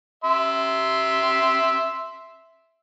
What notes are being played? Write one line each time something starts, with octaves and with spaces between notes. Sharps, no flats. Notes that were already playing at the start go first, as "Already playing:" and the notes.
E5 C6